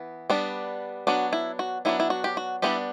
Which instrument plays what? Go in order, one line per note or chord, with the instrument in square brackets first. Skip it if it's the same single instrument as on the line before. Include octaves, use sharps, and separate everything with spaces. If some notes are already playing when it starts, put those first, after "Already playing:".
Already playing: [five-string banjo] E3 B3
G3 B3 D4
F#3 B3 D4 F#4
E4
F#4
F#3 B3 D4 E4
E4
F#4
G4
F#4
G3 B3 D4 E4 G4